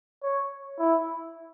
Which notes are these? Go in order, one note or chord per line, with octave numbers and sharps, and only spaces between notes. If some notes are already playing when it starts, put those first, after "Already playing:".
C#5
E4